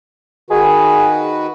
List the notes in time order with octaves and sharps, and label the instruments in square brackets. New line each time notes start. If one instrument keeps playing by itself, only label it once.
[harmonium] D#3 F#4 B4 [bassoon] G#4